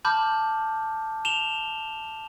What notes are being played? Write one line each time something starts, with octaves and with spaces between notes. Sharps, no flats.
A5 B5 D6 F6 G6
E7 F7 G7